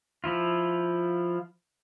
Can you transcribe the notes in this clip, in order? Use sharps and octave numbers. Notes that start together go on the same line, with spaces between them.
F3 E4 F4